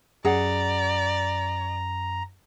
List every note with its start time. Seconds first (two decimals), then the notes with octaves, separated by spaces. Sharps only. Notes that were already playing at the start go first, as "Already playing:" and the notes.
0.25 F#2 G#4 D5 F#5 A#5